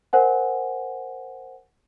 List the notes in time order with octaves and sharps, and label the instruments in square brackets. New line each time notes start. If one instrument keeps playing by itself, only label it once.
[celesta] A#4 C5 F#5 G#5